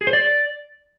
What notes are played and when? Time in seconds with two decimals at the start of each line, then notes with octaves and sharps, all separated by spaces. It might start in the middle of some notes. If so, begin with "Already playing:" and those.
0.01 G#4
0.07 C5
0.13 D5